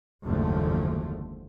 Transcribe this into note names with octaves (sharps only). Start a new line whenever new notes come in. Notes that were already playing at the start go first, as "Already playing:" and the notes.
F#1 D#2 G#2 D3 F3 A3